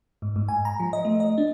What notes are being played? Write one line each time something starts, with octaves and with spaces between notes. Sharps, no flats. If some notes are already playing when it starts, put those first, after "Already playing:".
G#2
G#2
G#5
A#5
F3
D#5
A3
D#5
D4